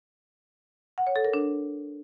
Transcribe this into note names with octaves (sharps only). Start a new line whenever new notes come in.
F#5
C#5
A4
A#4
D4